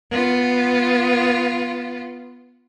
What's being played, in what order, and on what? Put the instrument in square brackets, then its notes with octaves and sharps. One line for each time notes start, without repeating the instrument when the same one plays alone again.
[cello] B3 F4